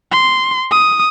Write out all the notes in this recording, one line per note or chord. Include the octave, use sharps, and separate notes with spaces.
C6
D#6